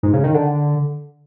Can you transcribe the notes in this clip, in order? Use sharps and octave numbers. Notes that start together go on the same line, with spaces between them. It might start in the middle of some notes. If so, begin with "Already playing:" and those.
G#2
C#3
D#3
D3